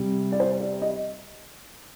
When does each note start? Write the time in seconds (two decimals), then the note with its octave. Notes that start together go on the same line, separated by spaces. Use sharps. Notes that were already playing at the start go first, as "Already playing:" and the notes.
Already playing: C3 G3
0.32 D5
0.40 C5
0.60 D5
0.82 D#5